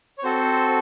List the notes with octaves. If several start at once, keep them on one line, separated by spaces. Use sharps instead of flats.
C#5
C4 F#4 A4 C5